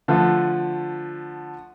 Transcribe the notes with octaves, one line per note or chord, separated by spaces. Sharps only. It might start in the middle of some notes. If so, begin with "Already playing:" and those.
D3 F3 A3